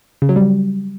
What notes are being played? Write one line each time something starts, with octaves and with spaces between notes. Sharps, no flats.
C#3
F#3
G3